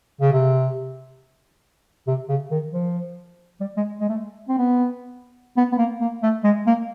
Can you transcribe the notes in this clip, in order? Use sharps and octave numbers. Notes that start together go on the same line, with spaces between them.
C#3
C3
C3
C#3
D#3
F3
G3
G#3
G#3
A3
C4
B3
B3
B3
A#3
A#3
A3
G#3
A#3